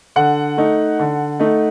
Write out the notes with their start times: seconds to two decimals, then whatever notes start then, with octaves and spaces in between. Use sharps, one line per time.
0.16 D3 F#5
0.57 A3 D#4
0.99 D3
1.40 A3 D#4